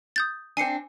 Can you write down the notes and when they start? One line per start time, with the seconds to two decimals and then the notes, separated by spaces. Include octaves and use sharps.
0.16 D#6 G6 A6
0.57 C4 D4 G#5 C7 C#7